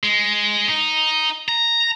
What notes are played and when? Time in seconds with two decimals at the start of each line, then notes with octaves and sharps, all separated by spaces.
0.03 G#3
0.68 D#4
1.49 A#5